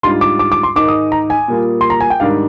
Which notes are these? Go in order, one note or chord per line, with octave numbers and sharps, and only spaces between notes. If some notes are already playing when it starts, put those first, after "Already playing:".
G#2 G3 D4 F4 C6
D6
D6
D6
C6
G#2 D#3 G#3 D#4 D6
D#6
A#5
G#5
A#2 G3 A#3 F4
C6
A#5
G#5
G5
G#2 D#3 G3 D4 F5